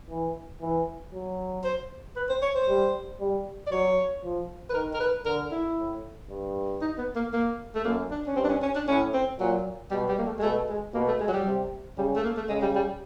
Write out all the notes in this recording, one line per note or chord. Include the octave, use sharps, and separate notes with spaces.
E3
E3
F#3
C5
B4
C5
C#5
C5
G3
G3
D5
F#3 C#5
F3
B4
D#3 A#4
A#4
B4
D3 A#4
E4
A2
G2
D#4
B3
A#3
A#3
A3
F#2 A#3
D4
C#4
G2 C4
D4
C#4
C#4
D4
A2 C#4
C4
A#2 F#3
B2 G3
G3
A#3
A3
G#3
B2 A3
G#3
B2 A#3
A3
G#3
F#3
G3
C3
C#3 G3
A3
A#3
A3
C#3 G#3
G3
G3